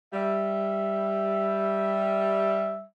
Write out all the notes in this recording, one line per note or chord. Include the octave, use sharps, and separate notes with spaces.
G3 E5